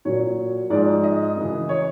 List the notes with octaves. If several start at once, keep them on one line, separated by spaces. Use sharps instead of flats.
A#2 F#3 C#5
G#2 F3 G#3 D5
D#5
F#2 C#3 E3
C#5